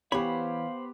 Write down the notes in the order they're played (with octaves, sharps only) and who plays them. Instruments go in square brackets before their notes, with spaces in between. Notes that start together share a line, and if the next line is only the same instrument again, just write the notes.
[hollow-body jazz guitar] E3 C#5 [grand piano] B3 G4 [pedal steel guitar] C5 B5 [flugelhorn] F5